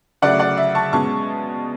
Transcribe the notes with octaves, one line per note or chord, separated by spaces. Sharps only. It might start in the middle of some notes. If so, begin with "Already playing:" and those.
C#3 F#3 A3 D5 F#5
D5 F#5
E5
A5 C#6
B2 G#3 C#4 A5 C#6